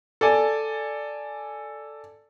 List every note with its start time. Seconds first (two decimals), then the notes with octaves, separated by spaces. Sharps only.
0.21 A4 D5 G#5